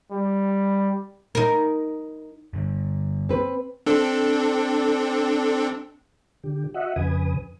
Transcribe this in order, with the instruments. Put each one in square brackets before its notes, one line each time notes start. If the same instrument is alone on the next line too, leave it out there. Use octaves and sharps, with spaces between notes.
[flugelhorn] G3
[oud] D#4 A#4
[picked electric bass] G2 D3
[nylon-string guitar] C4 B4
[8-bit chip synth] C4 D4 A4
[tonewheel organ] D3 G4
F#4 D#5 E5 F#5
F2 C#3 B4 G#5 D#6